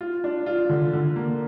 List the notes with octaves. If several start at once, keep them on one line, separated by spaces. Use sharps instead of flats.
F4
D4
F4
D3
D3
A#3